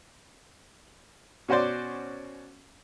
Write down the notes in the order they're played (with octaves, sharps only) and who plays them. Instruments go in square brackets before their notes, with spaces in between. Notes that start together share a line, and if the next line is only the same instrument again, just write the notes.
[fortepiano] B2 C#4 F#4 C5 D5